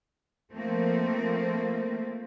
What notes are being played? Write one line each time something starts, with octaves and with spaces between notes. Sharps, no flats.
F3 A3 A#3 C4